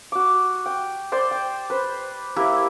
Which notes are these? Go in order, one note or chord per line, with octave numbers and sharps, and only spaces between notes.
F#4 D6
G5
C5 D5 C6
G5
B4 C5
A#3 E4 G4 E5